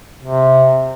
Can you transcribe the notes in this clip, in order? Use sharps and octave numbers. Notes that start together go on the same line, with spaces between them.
C3